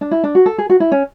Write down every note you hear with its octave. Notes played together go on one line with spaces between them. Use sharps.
D4
E4
D4
F#4
A4
G#4
F#4
E4
C#4